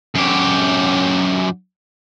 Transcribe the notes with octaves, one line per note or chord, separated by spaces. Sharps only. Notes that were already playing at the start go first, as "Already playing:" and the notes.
F#2 G4